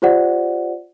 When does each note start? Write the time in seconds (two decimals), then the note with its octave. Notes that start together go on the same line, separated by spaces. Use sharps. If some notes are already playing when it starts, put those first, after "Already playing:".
0.02 F4 G4 C5 D5 F#5